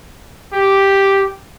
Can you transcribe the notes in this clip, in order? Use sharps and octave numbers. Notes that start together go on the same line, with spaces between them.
G4